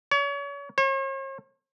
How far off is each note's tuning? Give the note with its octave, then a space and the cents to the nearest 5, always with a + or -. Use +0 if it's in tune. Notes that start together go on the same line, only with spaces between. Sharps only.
C#5 +35
C#5 -45